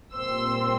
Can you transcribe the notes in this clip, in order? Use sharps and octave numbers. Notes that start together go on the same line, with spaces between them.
A#2 G3 C4 C6 E6